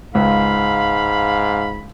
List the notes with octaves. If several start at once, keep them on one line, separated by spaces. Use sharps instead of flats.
C#2 G#2 F5 B5